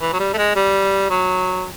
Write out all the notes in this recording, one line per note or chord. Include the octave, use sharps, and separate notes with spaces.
E3
F#3
G3
A3
G#3
G3
F#3